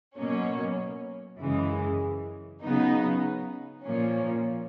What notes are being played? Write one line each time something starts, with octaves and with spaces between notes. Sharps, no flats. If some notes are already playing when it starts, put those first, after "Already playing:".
B2 F#3 A#3 C#4
F#2 C#3 E3 G#3
C#3 F#3 B3 D#4
A#2 F3 A#3 C#4